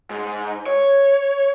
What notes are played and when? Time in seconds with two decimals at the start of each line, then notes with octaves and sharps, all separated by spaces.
0.10 G#2
0.66 C#5